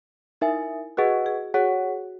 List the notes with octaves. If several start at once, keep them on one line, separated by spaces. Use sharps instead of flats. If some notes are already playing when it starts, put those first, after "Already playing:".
D#4 E4 A#4 E5 G#5
F#4 G#4 B4 D#5 F#5
G#4
F#4 G#4 C#5 F#5